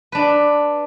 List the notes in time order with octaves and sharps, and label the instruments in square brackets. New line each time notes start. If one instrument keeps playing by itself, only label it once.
[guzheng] D4 B4